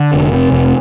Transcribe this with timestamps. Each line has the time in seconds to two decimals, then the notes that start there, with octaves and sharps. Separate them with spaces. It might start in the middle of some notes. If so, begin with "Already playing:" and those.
Already playing: D3
0.14 F1
0.33 C3
0.52 F1